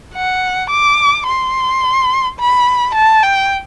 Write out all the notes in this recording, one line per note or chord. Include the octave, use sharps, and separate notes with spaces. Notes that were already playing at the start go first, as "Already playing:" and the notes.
F#5
D6
C6
B5
A5
G5